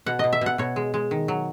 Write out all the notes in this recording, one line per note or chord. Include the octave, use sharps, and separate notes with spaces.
B2 F#5
B2 D#5
E5
B2 F#5
B2 C#5
G#3
G#3
D#3
F#3